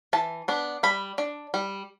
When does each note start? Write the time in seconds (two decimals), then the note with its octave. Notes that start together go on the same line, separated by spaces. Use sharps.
0.13 E3 A5
0.48 B3 D4
0.83 G3 B5
1.18 D4
1.54 G3